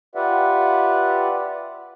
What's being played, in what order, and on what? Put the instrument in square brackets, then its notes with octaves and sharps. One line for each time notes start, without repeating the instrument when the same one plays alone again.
[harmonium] F4 G4 B4 D5 E5 F#5